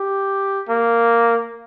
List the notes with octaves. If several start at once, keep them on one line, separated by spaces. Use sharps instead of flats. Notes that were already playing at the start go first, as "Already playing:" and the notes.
Already playing: G4
A#3